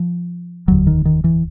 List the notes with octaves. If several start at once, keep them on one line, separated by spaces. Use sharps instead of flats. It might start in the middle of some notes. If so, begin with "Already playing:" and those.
Already playing: F3
F1 D#2 D3 F#3
D#3
D#3
E3